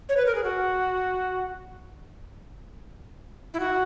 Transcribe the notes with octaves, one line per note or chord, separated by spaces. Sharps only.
C#5
B4
A#4
G#4
F#4
E4
F#4